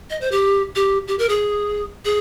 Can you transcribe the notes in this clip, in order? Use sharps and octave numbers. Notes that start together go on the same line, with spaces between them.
D#5
C5
G4
G4
G4
A#4
G#4
G#4